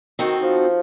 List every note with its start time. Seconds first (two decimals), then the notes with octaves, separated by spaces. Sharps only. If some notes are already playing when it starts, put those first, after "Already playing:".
0.19 D#3 C4 D#4 F#4 A4
0.43 F3